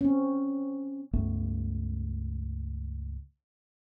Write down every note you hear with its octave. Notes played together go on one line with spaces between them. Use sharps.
C4 C#4
C#2 G2 A3 B3